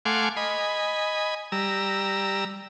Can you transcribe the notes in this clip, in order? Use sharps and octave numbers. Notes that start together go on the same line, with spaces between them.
A3 F5 F#5 G#5 C6 D6
D#5 G#5 B5
G3 A#5 E6